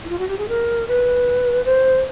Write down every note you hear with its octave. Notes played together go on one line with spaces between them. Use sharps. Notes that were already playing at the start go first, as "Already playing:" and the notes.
E4
F4
F#4
G4
G#4
A#4
B4
C5